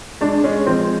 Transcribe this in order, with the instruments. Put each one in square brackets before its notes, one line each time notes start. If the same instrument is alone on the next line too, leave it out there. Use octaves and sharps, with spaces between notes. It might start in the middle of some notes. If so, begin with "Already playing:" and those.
[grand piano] G#3 [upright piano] D4
[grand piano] G#3 [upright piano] C#4
[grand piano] F3 [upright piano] C4